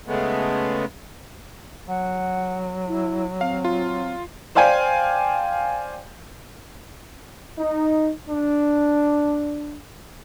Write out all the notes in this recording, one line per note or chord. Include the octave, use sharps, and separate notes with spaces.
C#3 G#3 A3 B3
F#3 F#5
E4
C4 F5
F4
C5 D5 F5 G5 G#5
D#4
D4